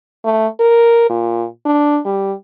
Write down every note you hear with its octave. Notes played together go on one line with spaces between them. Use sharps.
A3
A#4
A#2
D4
G3